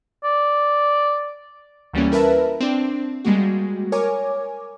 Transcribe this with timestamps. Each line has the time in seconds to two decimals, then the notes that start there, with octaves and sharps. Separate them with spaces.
0.24 D5
1.93 D2 E3 G3 A#3 C#4
2.12 E4 A#4 B4 E5 A5
2.60 C4 D4
3.24 G3 G#3 A#3 F#4
3.92 A#4 C#5 G#5 D6